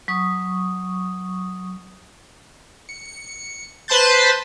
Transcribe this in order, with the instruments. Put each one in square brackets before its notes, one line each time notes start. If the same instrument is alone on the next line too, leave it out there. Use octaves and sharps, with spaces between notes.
[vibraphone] F#3 C#6 D#6
[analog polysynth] C#7
B4 C5 A5 C6 G6 A6